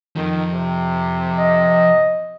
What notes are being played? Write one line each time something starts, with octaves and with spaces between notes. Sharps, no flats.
F2 D#3 F3
C3
D#5